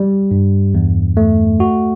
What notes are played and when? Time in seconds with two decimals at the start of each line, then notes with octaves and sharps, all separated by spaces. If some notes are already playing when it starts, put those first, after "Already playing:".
Already playing: G3
0.31 G2
0.74 E2
1.17 A3
1.60 F#4